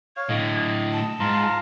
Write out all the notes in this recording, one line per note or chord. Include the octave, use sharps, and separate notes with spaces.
C#5 F5 G#6
A2 D3 D#5
A5
G#2 F4 A#5 C6